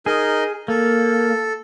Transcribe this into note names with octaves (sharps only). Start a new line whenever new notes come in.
D#4 G#4 A#4 D#5
A#3 A4